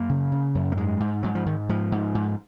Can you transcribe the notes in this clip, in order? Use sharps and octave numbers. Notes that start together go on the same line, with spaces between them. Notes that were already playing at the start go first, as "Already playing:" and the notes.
Already playing: F#2 A#3
C#3
C#3
F#2
A#3
G#2 G#3
G#2
G#2 F#3
F3
G#2 D#3
G#2 F3
G#2
G#2